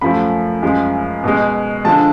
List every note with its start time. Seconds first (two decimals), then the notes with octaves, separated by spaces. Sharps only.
0.01 F#2 F3 A3 B5
0.63 F#2 F3 G#3
1.24 B2 G#3
1.85 D3 F3 G#3 A5